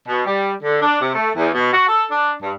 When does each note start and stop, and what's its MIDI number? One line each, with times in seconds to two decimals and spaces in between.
0.07 0.21 47
0.25 0.52 55
0.61 0.79 50
0.81 1.01 62
1.01 1.13 48
1.15 1.29 57
1.34 1.47 40
1.54 1.70 47
1.72 1.84 66
1.88 2.04 69
2.10 2.31 62
2.41 2.52 43